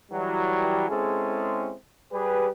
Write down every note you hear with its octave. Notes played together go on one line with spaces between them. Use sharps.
E3 F#3 G3
G#3 C4 C#4 E4 G#4 A4
G3 G4 G#4 B4